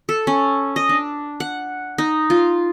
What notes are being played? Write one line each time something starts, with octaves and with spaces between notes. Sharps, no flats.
A4
C#4
D#5
D4
F#5
D#4
F4